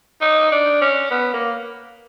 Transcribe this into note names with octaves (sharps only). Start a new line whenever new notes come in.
D#4
D4
C#4
B3
A#3